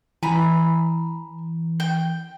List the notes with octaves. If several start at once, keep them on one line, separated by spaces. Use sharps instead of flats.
E3 G#5 A#5 B5
G5